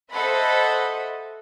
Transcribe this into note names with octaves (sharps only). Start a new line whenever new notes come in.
A4 C5 D#5 E5 F#5 B5